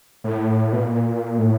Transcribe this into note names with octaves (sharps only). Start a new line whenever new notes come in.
A2
B2
A#2
A2